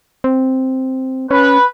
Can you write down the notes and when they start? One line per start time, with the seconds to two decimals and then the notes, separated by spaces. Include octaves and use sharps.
0.24 C4
1.31 C#4 B4